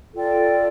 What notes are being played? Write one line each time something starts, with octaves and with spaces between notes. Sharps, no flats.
F4 A4 D5 G5